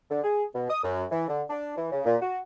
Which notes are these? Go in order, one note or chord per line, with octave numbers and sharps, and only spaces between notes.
D3
G#4
B2
D#6
F#2
E3
D3
D4
E3
C#3
A#2
F#4